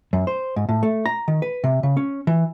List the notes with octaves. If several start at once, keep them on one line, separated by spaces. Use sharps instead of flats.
F#2
C5
G#2
A2
A3
A#5
D#3
B4
C3
C#3
C#4
E3